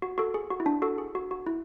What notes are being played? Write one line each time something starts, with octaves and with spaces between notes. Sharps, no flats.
F#4
F#4 A4
G#4
F#4
E4
D4
F#4 A4
G#4
F#4
F#4
E4